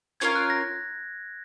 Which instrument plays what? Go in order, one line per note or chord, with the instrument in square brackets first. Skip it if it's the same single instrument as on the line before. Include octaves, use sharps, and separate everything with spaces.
[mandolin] C#4 F4 A#4 F5 [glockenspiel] G#6
[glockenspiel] F#6
A#6